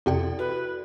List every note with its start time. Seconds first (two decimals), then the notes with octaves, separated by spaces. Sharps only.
0.06 F2 C3 E4 A4 D5 G5
0.39 F#4 B4